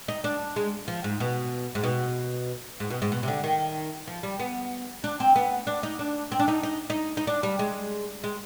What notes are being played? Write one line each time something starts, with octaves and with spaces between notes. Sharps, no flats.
D#4
D4
G#3
F3
G#2
B2
G#2
B2
G#2
B2
G#2
B2
C3
D3
D#3
F3
G3
B3
D4
C4
B3
D4
D#4
D4
C4
D4
D#4
D#4
D#4
D#4
D4
G3
G#3
G#3